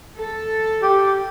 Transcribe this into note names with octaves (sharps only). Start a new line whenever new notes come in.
A4
G4